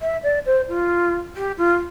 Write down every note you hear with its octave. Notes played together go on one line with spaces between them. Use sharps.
E5
D5
C5
F4
G4
F4